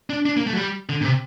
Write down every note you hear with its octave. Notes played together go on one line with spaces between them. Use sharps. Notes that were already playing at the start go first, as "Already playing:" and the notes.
D4
D4
A#3
A3
F#3
G3
D3
A#2
C3